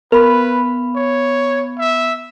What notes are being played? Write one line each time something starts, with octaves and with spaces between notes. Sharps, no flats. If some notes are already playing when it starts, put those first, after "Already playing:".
B3 A#4 B4 B5
C#5
E5